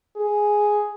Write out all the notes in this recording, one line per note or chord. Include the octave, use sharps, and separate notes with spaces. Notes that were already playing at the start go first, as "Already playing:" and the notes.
G#4